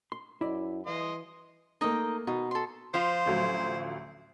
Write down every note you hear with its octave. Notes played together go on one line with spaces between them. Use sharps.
C6
F#2 E4 D5 D#5
E3 D#5 F5 C6
A3 A#3 D#4 D#5 G5
B2 D#4
A4 C6
F3 F4 C5
A1 D2 F#3